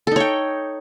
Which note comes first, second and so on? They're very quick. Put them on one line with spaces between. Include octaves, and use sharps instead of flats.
A4 D#4 C#5 G5